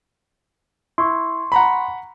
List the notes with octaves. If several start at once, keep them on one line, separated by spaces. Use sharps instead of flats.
E4 C6 C#6
F#5 A#5 B5